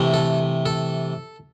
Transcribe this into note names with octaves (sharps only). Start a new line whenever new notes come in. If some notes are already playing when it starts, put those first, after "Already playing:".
Already playing: C3 E3 A3
A4
A4